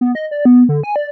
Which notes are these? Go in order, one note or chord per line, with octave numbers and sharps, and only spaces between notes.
B3
D#5
D5
B3
D3
G#5
D5